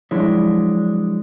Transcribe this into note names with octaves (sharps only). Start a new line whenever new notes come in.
F3 F#3 G#3 D4 E4 C#5